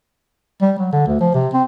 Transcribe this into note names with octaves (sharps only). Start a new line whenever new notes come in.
G3
F#3
D3
D2
F3
C3
C4